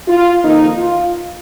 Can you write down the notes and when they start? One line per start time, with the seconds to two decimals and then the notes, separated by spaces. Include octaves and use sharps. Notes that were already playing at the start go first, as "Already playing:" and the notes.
0.08 F4
0.43 F2 D#3 A#3 D#4
0.78 F4